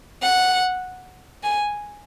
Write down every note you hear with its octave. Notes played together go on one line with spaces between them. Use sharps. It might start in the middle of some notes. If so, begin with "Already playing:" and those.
F#5
G#5